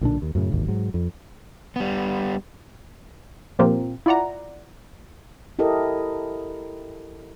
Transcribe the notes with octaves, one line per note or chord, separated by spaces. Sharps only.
B1 A#2 D3 D4
D#2
F#2 A2 C#3
D1 G#1 D#2
G#2 F#3
F2
G3 B3
A#2 F3 C4 F4 G4 A#4
E4 F4 D5 F#5 A#5
E4 G4 A4 A#4 D#5